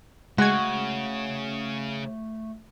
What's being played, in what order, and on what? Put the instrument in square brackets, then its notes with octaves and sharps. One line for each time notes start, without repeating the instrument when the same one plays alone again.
[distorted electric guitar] C#3 [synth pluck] G#3 G#6 [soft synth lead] A3 [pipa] F#4